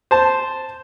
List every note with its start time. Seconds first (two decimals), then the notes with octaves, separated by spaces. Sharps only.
0.11 C5 A5